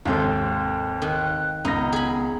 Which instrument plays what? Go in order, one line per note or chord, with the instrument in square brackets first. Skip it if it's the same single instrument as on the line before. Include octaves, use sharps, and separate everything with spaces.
[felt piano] D#2 G#2 [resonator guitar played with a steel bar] C3 C4 A4
[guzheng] D#3 [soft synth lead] F#6
[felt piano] C#2 A#6 [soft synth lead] B3 [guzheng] D#4
[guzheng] G#4 B5